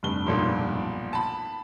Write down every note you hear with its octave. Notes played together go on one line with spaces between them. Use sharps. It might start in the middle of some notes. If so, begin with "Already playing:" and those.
F1 G2 G7
B1 A#2 F3
A5 B5